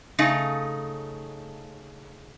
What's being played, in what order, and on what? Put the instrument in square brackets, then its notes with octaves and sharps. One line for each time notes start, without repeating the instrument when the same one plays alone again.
[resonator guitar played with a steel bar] C#3 A3 D#4